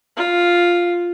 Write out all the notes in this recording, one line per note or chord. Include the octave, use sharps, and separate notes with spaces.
F4